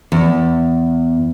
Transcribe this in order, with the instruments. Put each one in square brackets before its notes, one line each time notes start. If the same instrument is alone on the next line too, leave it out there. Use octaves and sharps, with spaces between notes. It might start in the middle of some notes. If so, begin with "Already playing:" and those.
[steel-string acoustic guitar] E2